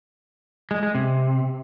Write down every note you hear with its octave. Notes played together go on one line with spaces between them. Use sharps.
G#3
G#3
C3